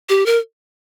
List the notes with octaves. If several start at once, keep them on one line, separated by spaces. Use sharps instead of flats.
G4
A#4